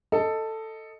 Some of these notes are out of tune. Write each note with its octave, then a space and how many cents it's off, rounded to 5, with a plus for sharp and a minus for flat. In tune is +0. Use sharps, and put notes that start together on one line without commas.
A4 +10 D#5 +5